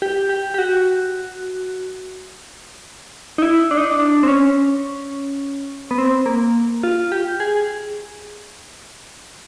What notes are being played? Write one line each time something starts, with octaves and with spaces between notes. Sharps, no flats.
G4
G4
G4
F#4
D#4
E4
D4
D#4
D4
D4
C4
C#4
B3
C4
A#3
F4
G4
G#4